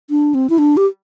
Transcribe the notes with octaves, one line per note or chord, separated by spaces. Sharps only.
D4
C4
E4
D4
G4